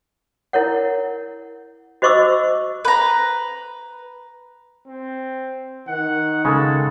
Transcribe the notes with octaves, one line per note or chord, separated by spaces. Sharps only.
E4 A#4 C#5 F#5
F#4 C5 D#5 C#6 D6 E6
B4 A#5
C4
D#3 F#5
C#3 G#3 A4